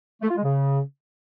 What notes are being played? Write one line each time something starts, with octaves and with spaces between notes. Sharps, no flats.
A3
F4
G#3
C#3